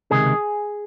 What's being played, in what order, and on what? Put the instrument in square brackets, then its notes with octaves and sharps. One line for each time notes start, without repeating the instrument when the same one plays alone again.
[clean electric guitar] C#2 C3 D#3 G#4